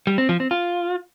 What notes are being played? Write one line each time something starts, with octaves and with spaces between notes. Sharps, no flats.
G3
C4
F3
C4
F4